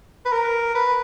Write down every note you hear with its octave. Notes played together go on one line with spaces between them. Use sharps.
B4
A#4
B4